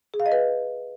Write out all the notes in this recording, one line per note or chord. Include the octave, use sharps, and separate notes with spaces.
G#4
F5
D#5
B4